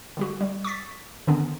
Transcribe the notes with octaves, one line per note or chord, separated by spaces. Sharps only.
D3 G3 F#4
G3
C#6 D6 A6 B6
D3 D#3 B3 C#4 D4